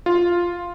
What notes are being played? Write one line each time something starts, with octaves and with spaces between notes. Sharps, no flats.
F4